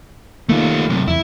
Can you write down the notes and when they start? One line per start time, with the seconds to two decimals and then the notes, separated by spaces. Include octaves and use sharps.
0.49 D#3 A3 A#3 F4
0.90 F#2 C3
1.08 E2 E4